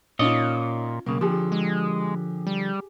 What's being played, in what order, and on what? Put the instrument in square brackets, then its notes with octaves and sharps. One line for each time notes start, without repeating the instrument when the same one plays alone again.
[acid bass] A#2 [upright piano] C#4 D#4 F4 [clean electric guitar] C#5 D#5
[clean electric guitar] B1 C#3 [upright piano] A#3
[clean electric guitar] D3 F3 [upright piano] G4 G#4
[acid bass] G#3
G3